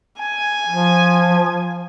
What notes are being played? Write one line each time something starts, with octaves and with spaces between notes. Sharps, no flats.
G#5
F3